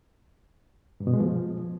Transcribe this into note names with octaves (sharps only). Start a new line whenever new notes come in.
G2
B2
G#3
F3